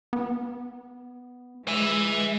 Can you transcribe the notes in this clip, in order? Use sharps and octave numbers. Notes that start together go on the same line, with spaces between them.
B3
G#3 E5 G#5